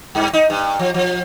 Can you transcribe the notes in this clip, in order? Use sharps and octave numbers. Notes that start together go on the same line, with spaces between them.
G2
D#4
G2
F3
F3